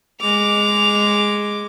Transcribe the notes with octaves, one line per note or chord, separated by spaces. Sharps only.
G#3 D6 F7